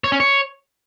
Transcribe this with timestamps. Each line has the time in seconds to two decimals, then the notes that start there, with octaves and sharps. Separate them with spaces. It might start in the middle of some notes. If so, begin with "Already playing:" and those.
0.04 C#5
0.12 C#4
0.20 C#5